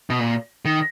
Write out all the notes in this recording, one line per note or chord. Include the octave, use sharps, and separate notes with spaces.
B2
A#2
D#3